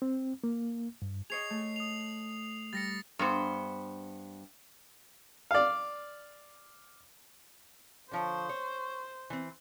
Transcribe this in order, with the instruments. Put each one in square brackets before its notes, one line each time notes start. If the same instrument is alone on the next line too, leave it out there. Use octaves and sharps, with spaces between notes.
[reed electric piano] C4
A#3
G2
[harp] G#4 C#5 D#5 [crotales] C7 F7
[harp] A3
[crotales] D#6 F7
[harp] G3 [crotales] A6 A#6 C#7
[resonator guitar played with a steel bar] G2 B3 C5
[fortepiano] D5 F5
[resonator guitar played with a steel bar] D3 F3 C#5 [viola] C5
[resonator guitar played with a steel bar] C#5
E3 C4